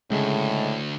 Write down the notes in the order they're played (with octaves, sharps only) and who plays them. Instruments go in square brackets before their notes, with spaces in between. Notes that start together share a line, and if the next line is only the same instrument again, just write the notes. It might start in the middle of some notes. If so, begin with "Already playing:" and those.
[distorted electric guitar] D2 [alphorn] A2 [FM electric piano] C#3 [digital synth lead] G#3